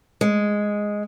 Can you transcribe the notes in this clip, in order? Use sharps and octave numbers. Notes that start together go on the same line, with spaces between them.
G#3